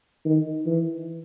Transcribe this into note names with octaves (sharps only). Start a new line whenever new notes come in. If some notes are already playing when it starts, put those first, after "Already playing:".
D#3
E3